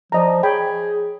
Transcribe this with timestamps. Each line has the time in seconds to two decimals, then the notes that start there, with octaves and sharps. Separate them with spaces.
0.12 F3 D5 D#5 A#5
0.43 G#4 C#5 G5 B5